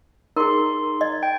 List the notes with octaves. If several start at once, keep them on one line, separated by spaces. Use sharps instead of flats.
D#4 G#4 A#4 C6
D#5 G#6
G5